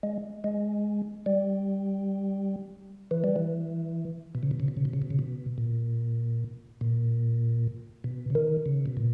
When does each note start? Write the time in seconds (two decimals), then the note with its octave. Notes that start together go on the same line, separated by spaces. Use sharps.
0.03 G#3
0.44 G#3
1.26 G3
3.11 E3
3.24 G3
3.36 E3
4.35 B2
4.43 C#3
4.51 B2
4.60 C#3
4.68 B2
4.77 C#3
4.85 B2
4.93 C#3
5.02 B2
5.11 C#3
5.19 B2
5.58 A#2
6.81 A#2
8.04 B2
8.30 C#3
8.35 D#3
8.66 C#3
8.86 B2
8.97 A#2